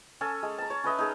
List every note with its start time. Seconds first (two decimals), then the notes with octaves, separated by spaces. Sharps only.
0.21 C#4 A4 G#5
0.43 G#3
0.58 A5 A#5
0.70 C#5
0.84 C#4 B4 D#5 E5
0.98 D#4 G#4 A#4